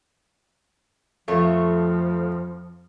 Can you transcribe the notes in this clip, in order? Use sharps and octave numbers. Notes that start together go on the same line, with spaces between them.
F2 F3 A3 F4 C#5